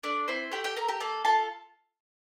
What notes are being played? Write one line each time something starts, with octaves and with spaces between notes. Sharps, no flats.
A3 D4 D5
C4 E4 C5
A3 G4 G5
G4 G5
A4 A#4 A#5
G4 G5
A#3 A4 A5
F4 A4 A5